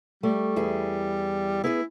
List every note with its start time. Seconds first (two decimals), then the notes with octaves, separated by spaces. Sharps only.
0.23 G3 A3
0.56 E2 E4 G#4
1.64 B3 E4 G#4 B4